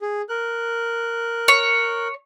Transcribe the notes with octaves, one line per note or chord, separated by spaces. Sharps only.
G#4
A#4 F#6
C#5